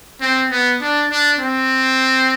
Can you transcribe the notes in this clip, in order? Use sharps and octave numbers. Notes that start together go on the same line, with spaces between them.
C4
B3
D4
D4
C4